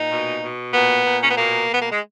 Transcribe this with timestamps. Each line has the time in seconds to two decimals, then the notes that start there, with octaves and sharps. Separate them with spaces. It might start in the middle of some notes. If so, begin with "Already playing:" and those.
Already playing: A#2 D#4
0.11 B2
0.43 B2
0.74 A#2 B3
1.05 A#2
1.23 C#4
1.30 B3
1.37 B2 A#3
1.69 B2
1.74 B3
1.82 A#3
1.91 G#3